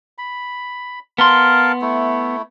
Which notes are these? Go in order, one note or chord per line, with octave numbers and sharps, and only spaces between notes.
B5
B3 A#4 F5 A5 C6
A3 E4